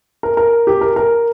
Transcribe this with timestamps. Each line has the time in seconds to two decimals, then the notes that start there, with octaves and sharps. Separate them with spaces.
0.23 A#4
0.37 A#4
0.67 G4
0.81 A#4
0.96 A#4